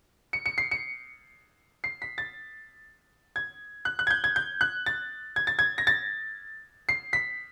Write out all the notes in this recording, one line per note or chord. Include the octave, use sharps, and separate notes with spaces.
C#7
C#7
C7
C#7
C7
B6
A6
G#6
F#6
F#6
G#6
G6
G#6
G6
F#6
A6
G#6
A6
G#6
A#6
A6
C7
B6